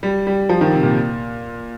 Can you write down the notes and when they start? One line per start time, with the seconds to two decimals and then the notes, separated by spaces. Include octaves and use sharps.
0.03 G3
0.27 G3
0.49 F3
0.61 D#3
0.73 C3
0.83 A#2